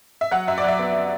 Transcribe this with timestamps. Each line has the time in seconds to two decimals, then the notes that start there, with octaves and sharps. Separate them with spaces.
0.21 E5
0.31 F#3 F#5
0.48 F#2 E5
0.58 D5
0.64 F#3 E5
0.79 B3